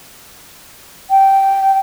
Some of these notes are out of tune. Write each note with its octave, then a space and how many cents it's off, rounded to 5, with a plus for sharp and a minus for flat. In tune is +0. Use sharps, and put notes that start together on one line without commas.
G5 -10